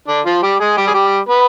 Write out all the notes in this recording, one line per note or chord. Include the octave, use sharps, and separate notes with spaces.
D3 D4
F3 F4
G3 G4
G#3 G#4
G3 G4
G#4
G3 G4
B3 B4